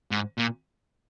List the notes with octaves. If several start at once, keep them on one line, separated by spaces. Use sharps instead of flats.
G#2
A#2